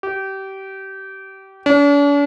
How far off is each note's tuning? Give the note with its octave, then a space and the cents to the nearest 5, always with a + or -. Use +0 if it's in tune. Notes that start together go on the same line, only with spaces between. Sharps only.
G4 -25
D4 -45